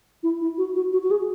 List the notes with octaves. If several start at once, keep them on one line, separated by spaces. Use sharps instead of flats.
E4
E4
F#4
F#4
F#4
F#4
G#4